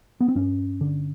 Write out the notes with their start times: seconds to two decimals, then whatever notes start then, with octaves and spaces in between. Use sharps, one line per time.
0.20 B3
0.28 C4
0.35 G2 C#4
0.81 D3